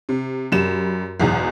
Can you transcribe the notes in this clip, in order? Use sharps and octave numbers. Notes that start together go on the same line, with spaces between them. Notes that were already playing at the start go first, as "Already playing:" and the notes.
C3
F#2 G3 E7
B1 E2 G#2